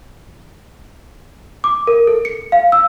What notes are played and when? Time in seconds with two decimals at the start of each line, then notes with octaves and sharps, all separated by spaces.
1.64 D6
1.87 A#4
2.07 A4
2.25 C#7
2.52 F5
2.72 E6